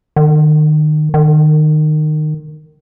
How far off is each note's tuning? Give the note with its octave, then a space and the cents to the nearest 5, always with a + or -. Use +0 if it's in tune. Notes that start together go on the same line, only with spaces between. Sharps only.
D#3 -30
D#3 -25